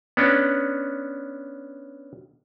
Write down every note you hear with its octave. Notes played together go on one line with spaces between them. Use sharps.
B3 C#4 D4